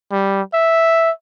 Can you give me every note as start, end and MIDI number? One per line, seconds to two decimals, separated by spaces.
0.12 0.41 55
0.53 1.10 76